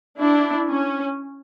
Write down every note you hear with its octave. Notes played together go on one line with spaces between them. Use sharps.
D4 E4
C#4